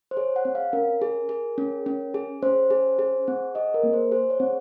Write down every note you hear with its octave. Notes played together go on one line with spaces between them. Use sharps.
C5
G#4 C#5
F#5
C4
F5
C#4 A#4
G#4
G#4
C#4
C#4
G#4
C#4 C5
G#4
G#4
C4
G#4 D#5
A#4
A#3
C5
G#4 C5
C#5
C4